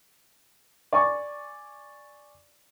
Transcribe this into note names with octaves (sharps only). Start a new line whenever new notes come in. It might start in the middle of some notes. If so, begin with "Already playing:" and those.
D5 G#5 C#6